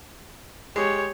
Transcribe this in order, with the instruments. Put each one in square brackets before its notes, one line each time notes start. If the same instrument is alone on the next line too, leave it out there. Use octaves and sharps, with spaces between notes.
[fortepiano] G#3 [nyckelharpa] G4 C#5